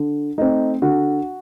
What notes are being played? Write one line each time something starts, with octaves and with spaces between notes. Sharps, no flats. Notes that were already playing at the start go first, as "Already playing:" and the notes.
Already playing: D3
A3 C4 D#4
D3 F#4